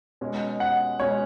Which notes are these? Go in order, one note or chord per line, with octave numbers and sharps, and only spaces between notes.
B2 G#3 C#4
F#5
B2 G#3 C#4 C#5